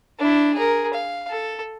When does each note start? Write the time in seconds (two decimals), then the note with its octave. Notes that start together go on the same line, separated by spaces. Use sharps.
0.19 D4 E4
0.55 G#4 A#4
0.94 F5
1.30 A4